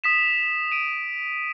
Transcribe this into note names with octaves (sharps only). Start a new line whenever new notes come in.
D#6 B6 E7
D7 D#7